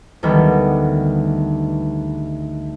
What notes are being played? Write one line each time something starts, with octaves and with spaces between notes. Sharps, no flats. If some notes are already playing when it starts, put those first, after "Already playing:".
D2 D#3 G3 B3